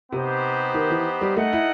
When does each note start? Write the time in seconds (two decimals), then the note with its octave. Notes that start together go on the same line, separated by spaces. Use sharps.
0.12 C3 B3 D#4 G4 C5
0.74 D#3
0.90 E3
1.21 G3
1.36 A3 D#4 A4 D#5 F#5
1.53 E4